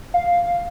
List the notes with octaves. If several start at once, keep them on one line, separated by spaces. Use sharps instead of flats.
F5